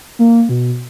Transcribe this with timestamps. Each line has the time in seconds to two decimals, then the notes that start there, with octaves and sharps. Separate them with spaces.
0.19 A#3
0.49 B2